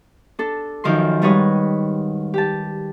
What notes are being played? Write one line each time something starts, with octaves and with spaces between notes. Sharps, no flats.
D4 A4
F#2 D#3 F3 C6
G#2 G3 D#4 B4 C#5 D#5
G4 A5